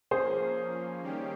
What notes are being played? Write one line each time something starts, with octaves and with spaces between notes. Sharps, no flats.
F3 A#3 C#4 G#4 C5
D#3 G3 A#3 C#4 G4